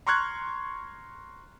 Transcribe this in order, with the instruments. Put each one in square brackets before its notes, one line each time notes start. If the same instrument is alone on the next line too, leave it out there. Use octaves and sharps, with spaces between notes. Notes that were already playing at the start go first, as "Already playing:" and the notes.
[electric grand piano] A#5 C6 C#6 F6 F#6 G#6